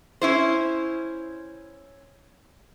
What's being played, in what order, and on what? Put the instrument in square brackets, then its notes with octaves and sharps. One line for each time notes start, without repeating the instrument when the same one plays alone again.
[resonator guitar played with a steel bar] C#4 E4 C5